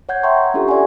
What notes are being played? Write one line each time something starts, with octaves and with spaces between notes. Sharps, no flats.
C#5 F#5 G6 G#6
E5 G5 A#5 C6 C#6
C#4 D4 F4 G4 A4
D5 E5 F#5 G#5 C6